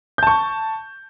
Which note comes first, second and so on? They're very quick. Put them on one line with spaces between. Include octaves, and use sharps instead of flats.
G6 A5 C#6